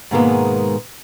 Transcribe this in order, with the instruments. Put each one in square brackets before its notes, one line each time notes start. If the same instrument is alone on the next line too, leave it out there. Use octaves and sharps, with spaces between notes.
[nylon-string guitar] G#2 B2 D#3 G#3 A#3 B3